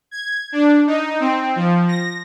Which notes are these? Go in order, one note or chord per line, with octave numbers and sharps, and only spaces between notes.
G#6
D4
D#4
C4
F3
A#6